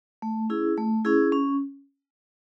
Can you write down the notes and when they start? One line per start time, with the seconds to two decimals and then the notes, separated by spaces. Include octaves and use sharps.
0.22 A3
0.50 C#4 E4 G#4
0.77 A3
1.05 C#4 E4 G#4
1.32 C#4